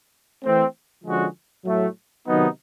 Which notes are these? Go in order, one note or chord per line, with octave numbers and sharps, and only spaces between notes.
E3 A3 C4
D3 F3 G#3 C#4 F#4
A2 F#3 A3
C3 D#3 F#3 B3 D#4